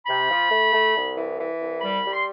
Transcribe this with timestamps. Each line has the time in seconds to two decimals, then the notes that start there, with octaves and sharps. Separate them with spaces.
0.05 C3 B5
0.28 F3
0.50 A3
0.72 A3
0.93 C2
1.16 E3
1.38 E3
1.60 C2
1.81 G3 B5
2.04 G3
2.13 C6